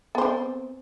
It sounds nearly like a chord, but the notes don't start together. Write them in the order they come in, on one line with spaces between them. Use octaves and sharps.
B3 C5 C4